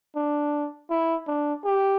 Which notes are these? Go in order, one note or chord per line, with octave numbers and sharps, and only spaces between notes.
D4
E4
D4
G4